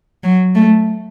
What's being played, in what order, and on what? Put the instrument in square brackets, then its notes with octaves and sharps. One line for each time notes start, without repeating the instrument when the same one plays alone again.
[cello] F#3
A3